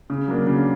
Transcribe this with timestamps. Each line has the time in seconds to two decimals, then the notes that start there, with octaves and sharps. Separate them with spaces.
0.10 C#3
0.28 F#3 A#3 D4
0.47 C#3